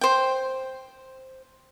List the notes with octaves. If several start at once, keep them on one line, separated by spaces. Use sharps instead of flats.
C5 G5